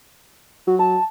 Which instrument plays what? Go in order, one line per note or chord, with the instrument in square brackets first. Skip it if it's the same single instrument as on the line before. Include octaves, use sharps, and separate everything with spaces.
[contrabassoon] F#3 [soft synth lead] F#4
[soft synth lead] A5